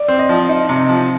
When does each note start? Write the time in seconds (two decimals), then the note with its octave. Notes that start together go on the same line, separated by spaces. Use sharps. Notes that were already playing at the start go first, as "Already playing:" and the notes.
Already playing: D5
0.08 C4
0.19 D#5
0.29 F3
0.49 D#4
0.69 C3
0.89 F3